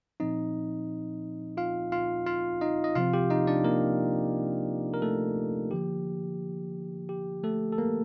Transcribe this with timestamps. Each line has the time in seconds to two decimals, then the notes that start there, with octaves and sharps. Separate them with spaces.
0.20 A#2 F3 C4 D#4 D#5
1.57 F4 F5
1.92 F4 F5
2.26 F4 F5
2.61 D#4 D#5
2.84 D#5
2.95 C3 F3 C4 F4 F5
3.13 G4 G5
3.30 D#4 D#5
3.47 D4 D5
3.64 A#3 A#4
4.94 A#4
5.02 A3 A4
5.71 D3 F3 A#3 G4
7.09 G4
7.43 A3 A4
7.72 A4
7.78 A#3 A#4